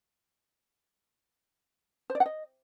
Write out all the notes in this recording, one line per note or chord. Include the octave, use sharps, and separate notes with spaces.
C5
D5
F#5
D#5